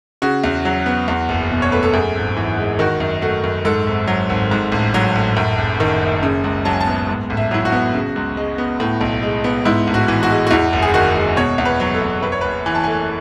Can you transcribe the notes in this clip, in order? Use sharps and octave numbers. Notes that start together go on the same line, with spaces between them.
C#3 F#4
E2
F#3
B3
E2
F#1
B2
C#5
A3 B4
A4
F#2 G#4
G#1
E3
G#3
D#3 F#4
F#2
A3 F#4
F#2
G#2 A4
G#1
F#3
G#1
G#2
A1
F#3
A1
F#2
F#1
D#3
F#1
C#3
C#2
F#3 A5
G#5
A5
B3
G#2
A1
E5
F#3 E4
F#4
B3
C#3
C#2
G#3
B3
A2
B1
G#3
B3
G#2 E4
A1
F#4
E3
F#4
G#3
F#4
E2 E4
F#1
G#4
D#3 F#4
G#3
B2 C#5
E2
B4
F#3
A4
E2
F#2 B4
C#5
F#1 B4
E3 G#5
A5
A3 G#5